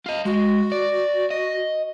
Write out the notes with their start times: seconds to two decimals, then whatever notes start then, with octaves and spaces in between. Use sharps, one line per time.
0.06 F4 D#5
0.26 G#3 F#4
0.72 D5
1.30 D#5